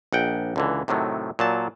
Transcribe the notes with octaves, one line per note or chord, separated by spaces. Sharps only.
A#1 F#5 G5
C#2 D3 E3
A2 C3 D#3 F#3 A3
A#2 F#3 A5